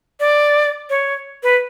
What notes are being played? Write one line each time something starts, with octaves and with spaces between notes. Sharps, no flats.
D5
C#5
B4